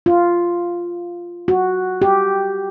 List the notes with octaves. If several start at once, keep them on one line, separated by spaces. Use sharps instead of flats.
F4
F#4
G4